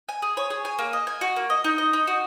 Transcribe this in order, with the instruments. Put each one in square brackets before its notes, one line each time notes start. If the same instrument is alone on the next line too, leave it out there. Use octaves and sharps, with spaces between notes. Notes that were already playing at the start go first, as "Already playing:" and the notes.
[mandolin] G#5
G#4
C#5
G#4
G#5
A#3
D#5
G#5
F#4
A#3
D#5
D#4
D#5
D#4
F#4